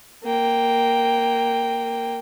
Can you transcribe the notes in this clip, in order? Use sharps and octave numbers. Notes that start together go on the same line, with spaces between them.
A#3 G5